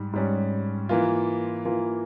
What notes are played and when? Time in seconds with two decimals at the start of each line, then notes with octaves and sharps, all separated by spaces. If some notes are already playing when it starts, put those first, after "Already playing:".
Already playing: G#2 G3
0.13 G#2 G3 C#4
0.89 E3 A#3 F4
1.65 E3 A#3 F4